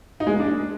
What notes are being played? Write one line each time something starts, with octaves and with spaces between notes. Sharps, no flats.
D#4
G#3
A#3
D4